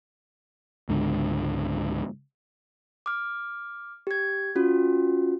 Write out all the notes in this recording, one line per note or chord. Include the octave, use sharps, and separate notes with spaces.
C#2 G#2 D3
D6 F6
G4 G#6
C#4 F4 F#4